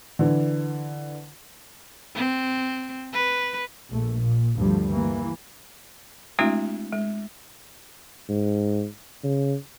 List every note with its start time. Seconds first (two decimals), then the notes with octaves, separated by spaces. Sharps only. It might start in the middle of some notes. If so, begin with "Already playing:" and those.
0.19 D3 E3
2.15 C4
3.13 B4
3.89 A#1 A3
4.20 A#2
4.55 D2 G2 D3 F3 G3 A3
4.91 E3 A#3
6.39 G#3 A3 C4 D4 E4 F#4
6.93 G#3
8.29 G#2
9.23 C#3